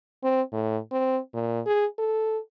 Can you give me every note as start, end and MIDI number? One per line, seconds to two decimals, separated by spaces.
0.23 0.42 60
0.53 0.78 45
0.92 1.19 60
1.34 1.61 46
1.66 1.86 68
1.99 2.38 69